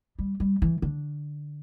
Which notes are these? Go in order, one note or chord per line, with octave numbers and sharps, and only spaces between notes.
G3
G3
E3
D3